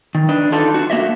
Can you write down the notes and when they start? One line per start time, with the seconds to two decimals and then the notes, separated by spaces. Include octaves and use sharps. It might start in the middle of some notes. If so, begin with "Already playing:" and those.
0.15 D#3
0.29 D4 B4 D#5
0.52 D4 D#4 F4 A4 B4
0.74 D4 F#4
0.90 A#3 F#4 D#5 E5